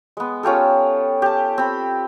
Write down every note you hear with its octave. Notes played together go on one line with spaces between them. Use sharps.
G#3 B3
C#4 F4 G4 A4
G4 A5
C4 B5